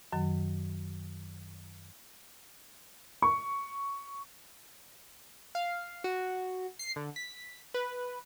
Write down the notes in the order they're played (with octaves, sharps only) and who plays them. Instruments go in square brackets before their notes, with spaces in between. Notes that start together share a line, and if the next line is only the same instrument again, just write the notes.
[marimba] F#2 D#3 F#3
[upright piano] C#6
[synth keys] F5
F#4
C7
D3
B6
B4